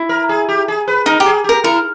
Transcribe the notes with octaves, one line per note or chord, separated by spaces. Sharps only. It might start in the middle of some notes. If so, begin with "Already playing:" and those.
Already playing: E4
A#4
G#4
G4
G#4
B4
D#4 A#4
G4
G#4
G4 A#4
E4 A#4